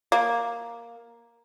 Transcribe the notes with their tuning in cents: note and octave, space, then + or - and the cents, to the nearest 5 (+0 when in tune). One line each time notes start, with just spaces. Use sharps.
A#3 +5